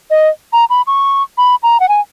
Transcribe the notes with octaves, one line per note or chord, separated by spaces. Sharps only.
D#5
A#5
B5
C#6
B5
A#5
F#5
G#5